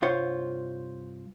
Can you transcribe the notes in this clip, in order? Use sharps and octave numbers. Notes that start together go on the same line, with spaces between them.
C2 G2 F4 C5 C#5